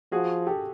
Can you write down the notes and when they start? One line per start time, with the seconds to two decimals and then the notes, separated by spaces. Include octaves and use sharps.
0.12 F3 F#4 G#4
0.47 G4 A4